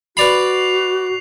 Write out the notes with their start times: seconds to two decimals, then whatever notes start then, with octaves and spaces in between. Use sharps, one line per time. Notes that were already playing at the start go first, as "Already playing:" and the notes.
0.17 F#4 B4 D5 B5 C7 F7